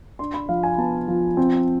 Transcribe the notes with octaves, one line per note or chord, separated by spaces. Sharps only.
D4 C6
B5
F3 F5
G#5
B3 A5
F3
C4